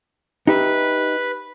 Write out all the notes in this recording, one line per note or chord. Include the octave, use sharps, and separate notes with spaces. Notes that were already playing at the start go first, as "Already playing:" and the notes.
D#4 G4 B4 E5